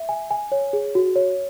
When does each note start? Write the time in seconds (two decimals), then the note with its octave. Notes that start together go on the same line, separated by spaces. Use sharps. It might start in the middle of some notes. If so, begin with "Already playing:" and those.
Already playing: E5
0.09 G#5
0.31 G#5
0.52 C#5
0.73 G#4
0.95 F#4
1.16 C#5